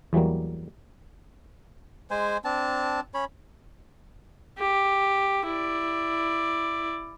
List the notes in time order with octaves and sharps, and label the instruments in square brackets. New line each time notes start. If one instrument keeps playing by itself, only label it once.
[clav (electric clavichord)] E2 E3 F#3 G3 A#3
[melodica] G#3 C5 G#5
C4 D4 A5
C#4 C#5 B5
[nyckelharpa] G4
E4 D5